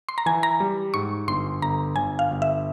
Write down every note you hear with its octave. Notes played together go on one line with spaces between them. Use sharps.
C6
A#5
E3 G#5
A#5
G3
G#2 C#6
G1 C6
G1 A#5
G1 G#5
F5
G1
E5